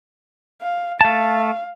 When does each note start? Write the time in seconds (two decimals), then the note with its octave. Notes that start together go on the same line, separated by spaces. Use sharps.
0.62 F5
1.01 A3 F5 A5